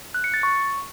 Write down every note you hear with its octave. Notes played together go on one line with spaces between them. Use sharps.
F#6
C#7
A6
C#6